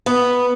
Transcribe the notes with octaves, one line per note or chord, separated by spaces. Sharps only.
B3